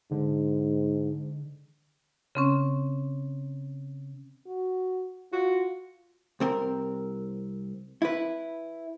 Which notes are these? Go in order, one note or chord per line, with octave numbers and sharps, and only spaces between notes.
G#2 D3
C#3 C4 C#4
F#4
F4 F#4
C2 C4 A#4
E4 B4